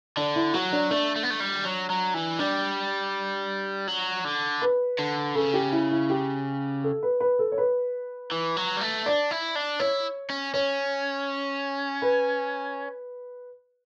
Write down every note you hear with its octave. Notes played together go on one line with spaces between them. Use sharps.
D3 D4
E4
F#3 F#4
D4
A3 D4
A3
B3
A3
G3
F#3
F#3
E3
G3 D4
F#3
D3
B4
D3
C#3 A4
G4
E4
E4
G4
A4
B4
B4
A4
C#5
B4
E3
F#3
G3
A3
D4 D5
E4
D4
E4 C#5
C#4
C#4 C#5
B4